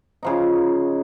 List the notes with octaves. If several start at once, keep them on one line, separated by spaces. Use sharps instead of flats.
C#3 F3 D#4